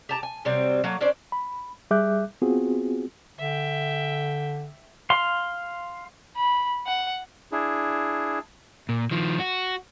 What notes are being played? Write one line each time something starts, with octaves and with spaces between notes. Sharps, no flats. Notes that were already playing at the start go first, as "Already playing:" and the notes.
G4 A5 A#5
G#5
C3 F#3 G3 C4
F#3 A3 A#3
C#4 D4 C5 D5
B5
G3 G#4 E5 D6 F#6 G6
B3 C4 F4 F#4 G#4
D3 E5 G5
F5 C6
B5
F#5
D4 E4 G#4
A#2
D#3 F3
F#4